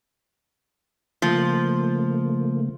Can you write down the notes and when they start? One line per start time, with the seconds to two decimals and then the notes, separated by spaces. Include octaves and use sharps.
1.22 C#3 F3 A3 A#3